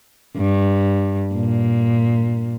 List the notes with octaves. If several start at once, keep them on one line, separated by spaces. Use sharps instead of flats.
G2
A#2